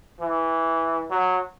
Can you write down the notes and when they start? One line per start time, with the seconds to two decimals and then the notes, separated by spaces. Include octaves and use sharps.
0.21 E3
1.10 F#3